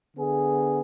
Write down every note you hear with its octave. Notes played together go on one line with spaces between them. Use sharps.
D3 B3 G#4